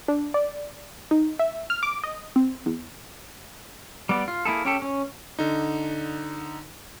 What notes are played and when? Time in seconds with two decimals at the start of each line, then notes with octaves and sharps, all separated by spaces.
0.08 D4
0.34 D5
1.11 D#4
1.39 E5
1.70 F6
1.83 D6
2.04 D#5
2.36 C4
2.66 E2
4.09 G3 B3 D5
4.28 F4
4.45 A#3 E4 G#4 A4
4.65 C#4 G4 A4
4.82 C#4
5.39 D3 D#4